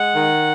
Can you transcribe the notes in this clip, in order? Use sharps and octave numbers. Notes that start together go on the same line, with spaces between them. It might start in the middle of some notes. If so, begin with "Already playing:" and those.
Already playing: G#3 F#5
D#3